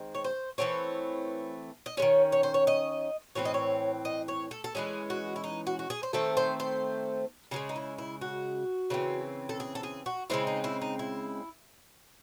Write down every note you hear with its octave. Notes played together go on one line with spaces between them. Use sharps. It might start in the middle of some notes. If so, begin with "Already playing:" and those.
Already playing: D#3 G#3 C4
C#5
C5
E3 A3 C4 C#5
D#5
D#3 G#3 C#4 C#5
C#5
C5
C#5
D#5
A2 E3 C4 C#5
D#5
C#5
D#5
C#5
A4
A4
E3 G#3 C#4 G#4
F#4
E4
D#4
F#4
F#4
G#4
C5
D#3 A3 C4 A4
C5
C5
C#3 E3 G#3 G#4
D#4
E4
E4
F#4
C#3 E3 C4
A4
G#4
A4
G#4
F#4
C#3 G#3 C4 E4
D#4
E4
D#4
E4